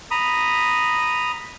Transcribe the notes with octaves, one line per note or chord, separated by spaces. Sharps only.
A#5 B5 D#6